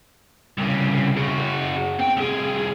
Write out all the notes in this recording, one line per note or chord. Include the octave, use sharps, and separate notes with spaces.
C2 C#3
C#3 F#4
C4 G5
C2 G#4